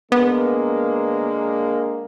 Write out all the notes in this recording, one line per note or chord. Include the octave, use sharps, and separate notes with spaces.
D3 G#3 A#3 B3